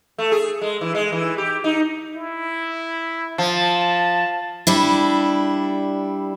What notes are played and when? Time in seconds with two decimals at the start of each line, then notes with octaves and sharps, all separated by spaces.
0.18 A3
0.32 G#4
0.61 G#3
0.81 E3
0.95 G#3
1.12 E3
1.38 G4
1.64 D#4
2.15 E4
3.38 F3 A5
4.67 G3 D4 E4